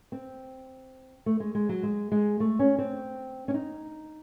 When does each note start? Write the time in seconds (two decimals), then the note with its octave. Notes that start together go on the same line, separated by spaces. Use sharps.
0.12 C4
1.26 A3
1.40 G#3
1.55 G#3
1.69 F#3
1.83 G#3
2.12 G#3
2.40 A3
2.59 C#4
2.79 C4
3.48 C#4
3.54 D#4